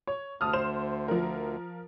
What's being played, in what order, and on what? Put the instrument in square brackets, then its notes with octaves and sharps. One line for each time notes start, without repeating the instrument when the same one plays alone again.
[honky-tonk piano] C#5
[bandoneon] D2 [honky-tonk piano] A5 D#6 F6
[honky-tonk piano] C5 C6 E7
F3 A#4